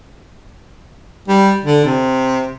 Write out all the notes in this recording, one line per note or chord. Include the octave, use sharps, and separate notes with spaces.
G3
D3
C3